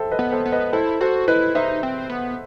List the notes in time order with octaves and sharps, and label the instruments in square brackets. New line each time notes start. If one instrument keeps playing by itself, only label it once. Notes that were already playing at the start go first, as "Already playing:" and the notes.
Already playing: [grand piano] A4 C5 E5 G5
B4 D#5
[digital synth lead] B3
[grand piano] A4 C5
[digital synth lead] B3
[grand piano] B4 D#5
[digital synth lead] E4 [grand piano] A4 C5
[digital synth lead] F#4 [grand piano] A4 C5
[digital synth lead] E4 [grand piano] B4 D#5
[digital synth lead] D#4 [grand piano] C5 E5
[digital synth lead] C4
B3